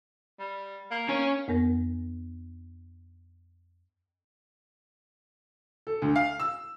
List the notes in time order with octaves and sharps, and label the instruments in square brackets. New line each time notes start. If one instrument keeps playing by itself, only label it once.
[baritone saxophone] G3
A#3
[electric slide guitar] C#4 C#5
[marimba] F2 B3 A#4 A#6
[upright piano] A4
D2
F5
E6